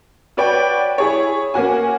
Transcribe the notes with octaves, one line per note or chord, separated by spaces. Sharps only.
F#4 B4 C#5 D5 G5
E4 G#4 C#5
A#3 C#4 F#4 G#5